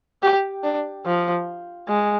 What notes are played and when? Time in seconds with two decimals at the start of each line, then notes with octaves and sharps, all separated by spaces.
0.23 G4
0.64 D4
1.06 F3
1.89 G#3